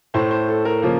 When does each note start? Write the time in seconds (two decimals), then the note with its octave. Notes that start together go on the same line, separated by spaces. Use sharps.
0.14 A2 A3 C5
0.31 C5
0.48 A4
0.65 A#4
0.82 C#3 F3 A#3